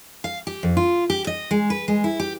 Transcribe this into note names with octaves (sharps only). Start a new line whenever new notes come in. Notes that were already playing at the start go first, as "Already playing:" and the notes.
F5
G4
F2
F4
G4
D#5
G#3
B4
G#3
E4
G4